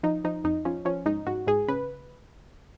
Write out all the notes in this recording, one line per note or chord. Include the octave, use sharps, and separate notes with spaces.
F3 D#4
F3 D#4
F2 D#4
F3 C#4
F3 C#4
G#2 D#4
G#2 F#4
G#2 G#4
C#3 B4